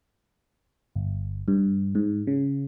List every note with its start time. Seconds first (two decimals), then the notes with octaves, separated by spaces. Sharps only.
0.96 G1
1.48 G2
1.95 G#2
2.27 C#3